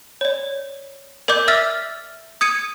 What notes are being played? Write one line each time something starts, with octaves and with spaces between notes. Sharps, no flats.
C#5 D5
A#4 D5 D#5 D6 G6
E5 E6 F6 A6 B6
D#6 G#6 C#7 D#7